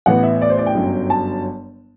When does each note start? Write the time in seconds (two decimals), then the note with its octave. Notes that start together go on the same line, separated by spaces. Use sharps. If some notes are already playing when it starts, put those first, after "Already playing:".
0.06 A1 A2 E3 B3 F#5
0.23 E5
0.41 D5
0.50 C5
0.58 D5
0.66 G5
0.75 G1 F#2 F#3
1.10 A5